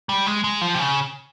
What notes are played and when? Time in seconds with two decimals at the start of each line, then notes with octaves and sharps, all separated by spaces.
0.09 G3
0.27 G#3
0.44 G#3
0.61 F3
0.74 C3
0.80 C#3